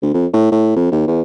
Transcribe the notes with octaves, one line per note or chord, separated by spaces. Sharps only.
D2
F2
A2
A2
F2
D#2
E2